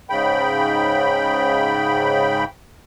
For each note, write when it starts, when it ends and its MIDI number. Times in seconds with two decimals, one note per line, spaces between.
0.10 2.44 44
0.10 2.44 49
0.10 2.44 79
0.10 2.44 83